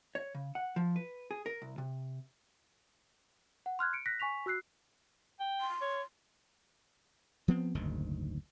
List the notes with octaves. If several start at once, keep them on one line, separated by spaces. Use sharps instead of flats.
C#5
C#3
F#5
F3
B4
G#4
A#4
C2
C3
F#5
C6 F6 F#6 G#6
C#7 D7
F#6 A#6 B6
G#5 C#6 B6 F7
F#4 E6 F#6 C7
G5
C6
C#5
F3 B3 C4
F#1 D2 G#2 D#3